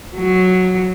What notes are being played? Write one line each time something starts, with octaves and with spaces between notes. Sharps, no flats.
F#3